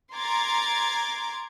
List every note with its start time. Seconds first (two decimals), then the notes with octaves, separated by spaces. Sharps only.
0.15 A#5 C6 D6 G#6 A6